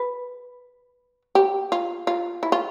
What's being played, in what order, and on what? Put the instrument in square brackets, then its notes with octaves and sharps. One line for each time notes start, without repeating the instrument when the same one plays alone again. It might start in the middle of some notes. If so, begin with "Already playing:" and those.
Already playing: [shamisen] B4
G4
F4
F4
E4
F4